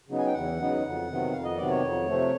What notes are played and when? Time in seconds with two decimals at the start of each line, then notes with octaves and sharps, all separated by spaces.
0.08 C#3 F#3 B3 D#4
0.19 G#5
0.26 G5
0.33 E2 F#5
0.59 C#3 F#3 B3 D#4
0.83 F2
1.08 C3 D#3 F#3 B3
1.32 F2 F5
1.45 D#5
1.57 C3 D#3 F#3 B3 D5
1.70 C#5
1.82 F2
2.06 C3 F3 A3